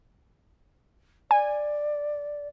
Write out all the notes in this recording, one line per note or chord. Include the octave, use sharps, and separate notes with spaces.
D5 G#5